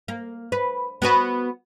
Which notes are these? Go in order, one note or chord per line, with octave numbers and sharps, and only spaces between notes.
A#3
B4
B3 F#4 B4